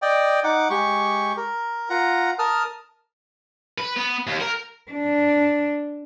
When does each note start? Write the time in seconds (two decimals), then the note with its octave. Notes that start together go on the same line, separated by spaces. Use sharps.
0.02 D5 D#5 G5
0.44 D#4 F#5 D6
0.70 G#3 G4 C#6
1.37 A#4
1.90 F4 F#5 A#5
2.39 A#4 A5 D#6 F6
3.78 B4
3.96 B3
4.27 D#2
4.40 A#4
4.91 D4